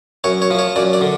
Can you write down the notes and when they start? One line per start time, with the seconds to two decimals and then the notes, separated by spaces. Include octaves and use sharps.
0.24 F#2 C#5
0.42 C#5
0.50 F3
0.59 C#5
0.76 F#2 D5
0.93 D5
1.01 D3